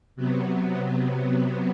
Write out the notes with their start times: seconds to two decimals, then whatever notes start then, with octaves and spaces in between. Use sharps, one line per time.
0.16 C3 F#3 B3